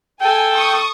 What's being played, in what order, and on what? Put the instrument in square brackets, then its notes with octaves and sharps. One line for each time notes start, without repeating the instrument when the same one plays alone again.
[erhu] A4 [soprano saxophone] G5 [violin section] G#5
[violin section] C#6 D#6